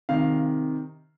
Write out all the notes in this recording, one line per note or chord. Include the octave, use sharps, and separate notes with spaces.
C3 D#3 F5